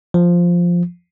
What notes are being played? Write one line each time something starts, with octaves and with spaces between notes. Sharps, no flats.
F3